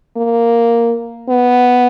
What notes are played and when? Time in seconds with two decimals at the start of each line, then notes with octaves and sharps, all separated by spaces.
0.17 A#3
1.29 B3